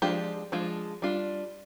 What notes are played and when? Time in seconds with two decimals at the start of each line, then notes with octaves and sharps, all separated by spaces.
0.02 F3 G#3 D4 F4 G4
0.52 F3 G#3 D4 F4
1.02 G3 D4 F4